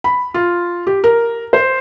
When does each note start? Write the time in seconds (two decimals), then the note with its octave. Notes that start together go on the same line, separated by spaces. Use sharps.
0.04 B5
0.34 F4
0.87 G4
1.04 A#4
1.53 C5